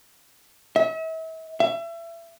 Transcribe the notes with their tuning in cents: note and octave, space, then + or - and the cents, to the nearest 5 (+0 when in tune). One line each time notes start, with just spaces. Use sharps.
E5 -40
E5 +30